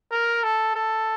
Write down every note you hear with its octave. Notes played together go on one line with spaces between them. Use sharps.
A#4
A4
A4